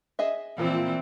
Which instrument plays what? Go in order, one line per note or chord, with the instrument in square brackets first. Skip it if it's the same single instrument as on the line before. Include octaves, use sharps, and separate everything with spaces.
[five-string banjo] G#4 D#5 E5
[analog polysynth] A#2 F3 [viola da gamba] E3 C4